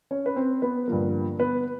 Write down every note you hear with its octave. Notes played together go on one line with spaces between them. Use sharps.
C#4 C#5
B4
C4 C5
B3 B4
G2 D3 F3 A#3 A#4
B3 B4